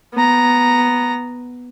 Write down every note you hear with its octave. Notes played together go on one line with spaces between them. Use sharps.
B3 A#5